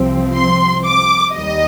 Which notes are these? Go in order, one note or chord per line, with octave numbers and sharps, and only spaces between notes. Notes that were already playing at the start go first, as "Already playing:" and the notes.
Already playing: C2 C3 F3 C4
C6
D6
D#2 D#3 G3 D#5